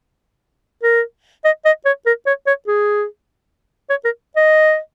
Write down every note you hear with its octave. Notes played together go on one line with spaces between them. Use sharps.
A#4
D#5
D#5
C#5
A#4
C#5
C#5
G#4
C#5
A#4
D#5